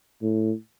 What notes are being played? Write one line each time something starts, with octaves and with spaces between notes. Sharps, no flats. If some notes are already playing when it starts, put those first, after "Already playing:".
A2